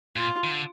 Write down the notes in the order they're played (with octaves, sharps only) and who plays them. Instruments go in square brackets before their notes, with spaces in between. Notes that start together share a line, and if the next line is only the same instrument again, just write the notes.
[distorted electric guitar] A#2 [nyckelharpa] F4
[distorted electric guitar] D#3
D3